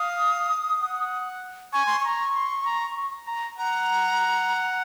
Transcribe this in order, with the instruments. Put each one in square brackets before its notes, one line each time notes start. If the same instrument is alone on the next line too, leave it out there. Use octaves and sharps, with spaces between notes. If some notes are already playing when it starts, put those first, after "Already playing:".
Already playing: [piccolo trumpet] F5 [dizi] D#6
[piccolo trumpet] F#5
[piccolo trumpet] G#5 [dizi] C#6
[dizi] C6
[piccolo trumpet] A#5 [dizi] C#6
[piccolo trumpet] C6
A#5
A#5
[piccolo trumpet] F#5 [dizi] A#5